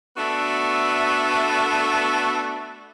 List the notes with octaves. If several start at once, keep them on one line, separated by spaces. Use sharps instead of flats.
A3 B3 D4 F#4 A4 E5